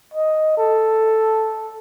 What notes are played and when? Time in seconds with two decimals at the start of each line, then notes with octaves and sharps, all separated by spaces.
0.14 D#5
0.58 A4